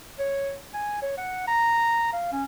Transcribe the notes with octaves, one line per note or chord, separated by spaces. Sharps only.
C#5
G#5
C#5
F#5
A#5
F5
C#4